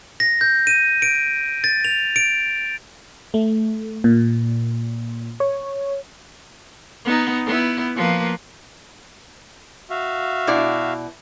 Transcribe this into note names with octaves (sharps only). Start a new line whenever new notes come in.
A#6
G6
D#7
D7
A6
F7
D7
A3
A#2
C#5
B3 D#4
B3 E4
F3 A#3 B4
F#4 E5 F5
B2 E4 D5